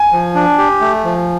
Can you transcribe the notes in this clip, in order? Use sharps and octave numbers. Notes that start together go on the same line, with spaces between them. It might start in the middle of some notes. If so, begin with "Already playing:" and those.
Already playing: G#5
F3
D4
G4
A3
F3